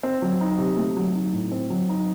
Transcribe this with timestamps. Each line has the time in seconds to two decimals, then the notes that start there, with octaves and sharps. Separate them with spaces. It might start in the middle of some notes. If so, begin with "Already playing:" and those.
0.03 C4
0.22 F#3
0.41 D#4
0.58 C3
0.77 A3
0.97 F#3
1.15 D#4
1.33 A2
1.52 C4
1.70 F#3
1.89 D#4